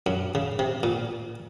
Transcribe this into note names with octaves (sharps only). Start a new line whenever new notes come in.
F#2
C#3
C3
A#2